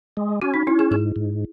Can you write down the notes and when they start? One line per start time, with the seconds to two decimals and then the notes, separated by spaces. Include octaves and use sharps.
0.17 G#3
0.42 C#4 F#4
0.54 D#4
0.67 C#4 E4
0.79 G#4
0.91 G#2 G#4
1.16 G#2